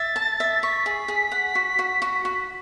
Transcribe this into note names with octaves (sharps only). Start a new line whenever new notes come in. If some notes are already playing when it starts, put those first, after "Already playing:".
Already playing: E5 A6
A5
E5
C#6 B6
G#4
G#4
F#5
F#4
F#4
F#4
F#4